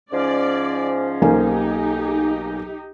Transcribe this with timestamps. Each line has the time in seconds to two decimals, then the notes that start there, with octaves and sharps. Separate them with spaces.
0.12 G#2 F3 C#4 D5
1.22 B1 A#3 D#4 G4 G#5